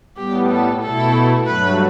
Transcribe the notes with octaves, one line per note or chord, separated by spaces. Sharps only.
A2 G3 B3 G4
A4
B2 A3 E4 A4
G2 F#3 A3 B4